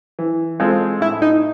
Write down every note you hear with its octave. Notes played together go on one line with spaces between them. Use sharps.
E3
G#3 C4 F4 A4
A2 E4
D#4